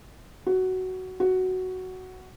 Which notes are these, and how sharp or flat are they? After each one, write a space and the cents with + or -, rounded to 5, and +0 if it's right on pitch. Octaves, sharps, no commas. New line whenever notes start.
F#4 +10
F#4 +5